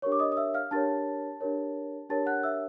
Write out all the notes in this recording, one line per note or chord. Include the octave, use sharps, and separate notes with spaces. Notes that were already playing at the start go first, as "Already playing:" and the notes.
D4 G4 A#4 C#5 C#6
D6
D#5 D#6
D#6
E5 E6
F5 F6
D4 G4 A#4 C#5 A5 A6
D4 G4 A#4 C#5
D4 G4 A#4 C#5 A5 A6
F#5 F#6
E5 E6